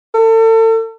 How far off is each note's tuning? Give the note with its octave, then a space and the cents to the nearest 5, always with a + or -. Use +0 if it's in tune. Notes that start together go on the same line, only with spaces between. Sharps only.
A4 +35